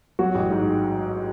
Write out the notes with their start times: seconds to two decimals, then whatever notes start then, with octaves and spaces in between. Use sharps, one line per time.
0.19 F#3 F#4
0.35 A1
0.50 G#2